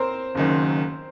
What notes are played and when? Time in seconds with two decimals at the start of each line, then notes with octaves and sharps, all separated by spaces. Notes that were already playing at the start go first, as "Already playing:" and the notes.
Already playing: C4 A#4 C5
0.35 F#1 F#2 D#3